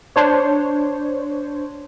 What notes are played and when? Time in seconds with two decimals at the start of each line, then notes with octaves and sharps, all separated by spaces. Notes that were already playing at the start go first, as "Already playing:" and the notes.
0.16 D4 C5 C#5